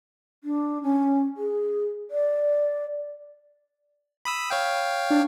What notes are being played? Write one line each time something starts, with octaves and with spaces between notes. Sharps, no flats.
D4
C#4
G#4
D5
B5 D#6 E6
C#5 F5 G5
D4